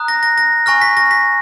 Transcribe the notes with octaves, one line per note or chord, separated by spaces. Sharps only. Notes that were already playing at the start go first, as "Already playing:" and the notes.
Already playing: A#5 D#6 F#6
A#6
A#6
A#6
G#5 C#6 F6 A#6
B6
A#6
B6